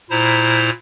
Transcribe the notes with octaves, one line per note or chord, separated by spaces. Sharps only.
A#2 E4 C5 A#5